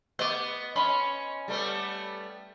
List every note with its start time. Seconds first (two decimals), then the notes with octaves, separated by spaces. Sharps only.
0.19 B3 D#5 D6
0.76 C#4 D#5 B5 C6
1.48 G3 A3 B3